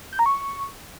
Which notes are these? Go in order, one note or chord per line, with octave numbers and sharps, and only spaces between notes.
G6
A#5
C#6